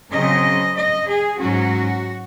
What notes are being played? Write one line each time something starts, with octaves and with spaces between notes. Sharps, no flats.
C#3 F#3 C4 D#5
D#5
G#4
G#2 F#3 C#4 F#4